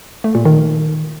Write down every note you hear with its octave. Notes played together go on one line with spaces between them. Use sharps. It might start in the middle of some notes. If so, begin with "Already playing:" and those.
A3
A#2
D#3